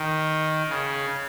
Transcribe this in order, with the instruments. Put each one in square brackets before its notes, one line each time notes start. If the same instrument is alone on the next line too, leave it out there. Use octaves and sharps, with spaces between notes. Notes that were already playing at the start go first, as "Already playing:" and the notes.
Already playing: [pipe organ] D#3
C#3